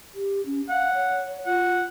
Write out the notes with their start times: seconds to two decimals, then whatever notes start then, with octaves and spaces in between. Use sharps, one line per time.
0.15 G4
0.46 C#4
0.69 F5 F#5
0.94 C#5
1.46 F4 F#5